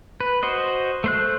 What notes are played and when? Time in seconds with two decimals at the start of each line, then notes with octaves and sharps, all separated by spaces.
0.20 B4
0.43 F#4 C5 D#5
1.04 A3 C5 F#6